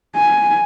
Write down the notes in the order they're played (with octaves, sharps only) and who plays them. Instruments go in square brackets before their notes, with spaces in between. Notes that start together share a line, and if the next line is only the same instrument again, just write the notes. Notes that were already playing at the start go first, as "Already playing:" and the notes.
[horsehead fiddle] G#5